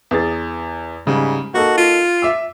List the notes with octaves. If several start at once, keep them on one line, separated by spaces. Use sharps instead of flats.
E2 G#4 A6
G#2 C#3 G3
A#3 D#4 F#4 A4
F4
E5 D6 E6